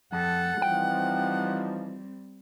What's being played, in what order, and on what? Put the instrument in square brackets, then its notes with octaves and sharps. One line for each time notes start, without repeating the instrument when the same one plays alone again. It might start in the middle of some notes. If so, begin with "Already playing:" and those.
[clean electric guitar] F2 [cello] A4 [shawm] F#5
[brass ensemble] E3 F3 D#4 [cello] G3 C4 [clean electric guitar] G5